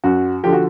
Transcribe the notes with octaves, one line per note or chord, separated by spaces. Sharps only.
F#2 F#4
D3 F3 G4
F#4